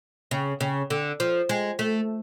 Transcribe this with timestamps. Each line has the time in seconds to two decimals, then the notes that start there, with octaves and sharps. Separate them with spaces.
0.31 C#3
0.61 C#3
0.90 D3
1.20 F3
1.49 G#3
1.79 A3